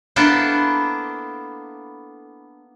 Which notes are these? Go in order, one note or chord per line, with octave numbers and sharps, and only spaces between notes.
A#3 B3 D4 E4 A4 C5